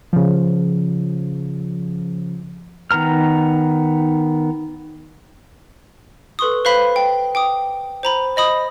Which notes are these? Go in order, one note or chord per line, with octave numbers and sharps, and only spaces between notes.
C#3 F3
D#3 B3 A#5 F6
A4 B4 C6 C#6 D#6
B4 C5 F5 B5 B6 G7
G5
G5 D6 D#6
C5 A#5 B5
C5 D#5 B5 D#6